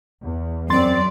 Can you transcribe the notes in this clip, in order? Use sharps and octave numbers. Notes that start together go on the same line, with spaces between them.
E2
F#2 C4 D5 C6 A6